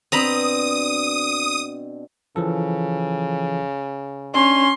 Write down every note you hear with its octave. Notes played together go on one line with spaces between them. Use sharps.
B2 C4 D4 A#5 B5 D#6
C#3 E3 F3 A4
C#4 D4 C6